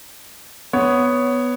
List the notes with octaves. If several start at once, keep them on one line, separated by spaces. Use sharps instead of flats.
B3 C#5